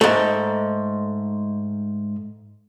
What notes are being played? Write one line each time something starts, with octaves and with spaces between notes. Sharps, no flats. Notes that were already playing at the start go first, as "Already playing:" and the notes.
G#2 A3